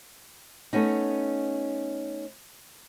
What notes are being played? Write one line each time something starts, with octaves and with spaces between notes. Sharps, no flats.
A3 B3 C#4 D#4